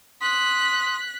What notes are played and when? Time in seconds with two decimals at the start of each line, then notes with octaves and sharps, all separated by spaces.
0.21 C6 D#6 F#6 B6